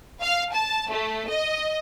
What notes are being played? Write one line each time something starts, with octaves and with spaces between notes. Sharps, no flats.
F5
A5
A3
D#5